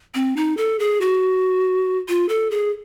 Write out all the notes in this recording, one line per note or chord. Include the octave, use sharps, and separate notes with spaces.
C4
D#4
A4
G#4
F#4
F4
A4
G#4